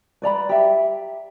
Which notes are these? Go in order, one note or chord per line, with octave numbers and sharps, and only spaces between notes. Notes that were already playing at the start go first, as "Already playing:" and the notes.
B4 D5 A#5 B5
G4 E5